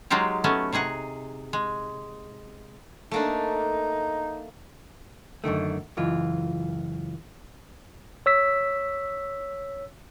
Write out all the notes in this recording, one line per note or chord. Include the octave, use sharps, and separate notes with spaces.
F#3 G#3 D#4 F4 G4
A3 B3 C#4
C3 D#4 G#4 F#5
G#3
A3 A#3 D4 D#4
F#2 D3 D#3 A3
C#2 F#2 E3 F4
C#5 E6 B6